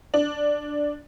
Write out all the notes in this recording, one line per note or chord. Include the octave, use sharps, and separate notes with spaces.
D4